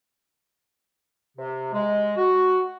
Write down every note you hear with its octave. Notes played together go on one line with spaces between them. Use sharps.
C3
G#3
F#4